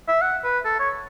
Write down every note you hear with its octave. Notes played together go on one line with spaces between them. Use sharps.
E5
F#5
B4
A4
C#5